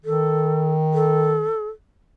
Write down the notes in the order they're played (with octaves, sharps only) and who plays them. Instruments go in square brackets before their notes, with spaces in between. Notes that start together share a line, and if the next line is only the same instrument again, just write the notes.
[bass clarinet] D#3 [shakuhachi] A4
[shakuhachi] A4